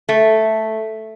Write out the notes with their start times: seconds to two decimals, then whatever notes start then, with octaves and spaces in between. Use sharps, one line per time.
0.09 A3